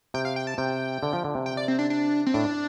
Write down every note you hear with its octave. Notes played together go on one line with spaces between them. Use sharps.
C3 G5
F5
G5
A5
C3 G5
D3
F3
D3
C3
G5
D5
C4
D4
D4
C4
A2 D4